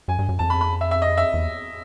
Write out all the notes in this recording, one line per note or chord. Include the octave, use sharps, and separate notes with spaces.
F#2 G#5
G2
F#2
F2 A5
B5
B5
E5
E5
D#5
E5
E2